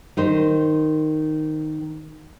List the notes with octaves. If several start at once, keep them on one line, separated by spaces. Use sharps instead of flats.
D#3 D#4 C5